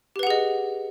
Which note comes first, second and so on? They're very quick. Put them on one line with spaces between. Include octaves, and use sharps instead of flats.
G4 B4 F#5 G#4 D#5